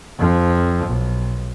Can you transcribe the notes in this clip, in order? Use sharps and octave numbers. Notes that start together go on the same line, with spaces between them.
F2 F3
B1